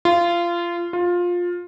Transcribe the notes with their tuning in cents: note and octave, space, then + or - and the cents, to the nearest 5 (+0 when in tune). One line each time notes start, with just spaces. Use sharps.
F4 -20
F4 +15